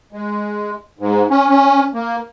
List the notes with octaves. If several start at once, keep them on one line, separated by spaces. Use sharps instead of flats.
G#3
G#2
C#4
C#4
A#3